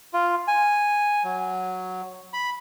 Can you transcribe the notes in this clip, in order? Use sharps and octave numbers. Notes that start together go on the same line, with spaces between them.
F4
G#5
F#3
B5